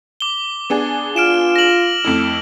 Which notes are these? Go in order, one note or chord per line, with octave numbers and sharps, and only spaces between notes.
D6 G7
B3 D4 G#4
F4 F6 D7 E7
A#6 F#7
F2 A3 E4